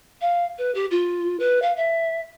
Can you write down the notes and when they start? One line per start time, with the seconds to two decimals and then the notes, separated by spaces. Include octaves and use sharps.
0.21 F5
0.58 B4
0.75 G4
0.91 F4
1.40 B4
1.62 F5
1.77 E5